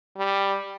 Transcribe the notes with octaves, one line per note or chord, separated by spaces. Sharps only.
G3